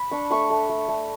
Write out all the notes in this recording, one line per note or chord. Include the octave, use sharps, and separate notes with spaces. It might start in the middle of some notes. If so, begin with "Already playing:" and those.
Already playing: B5
D4 C#6
A3 C#6
A3
A3
A3